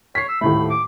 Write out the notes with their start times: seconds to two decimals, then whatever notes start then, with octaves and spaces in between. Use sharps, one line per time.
0.15 C#5 B6 C7
0.29 E6
0.41 D#1 A2 A3 B5
0.70 D6